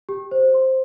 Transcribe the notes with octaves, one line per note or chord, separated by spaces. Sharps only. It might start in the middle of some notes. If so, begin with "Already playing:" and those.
G4
C5
C6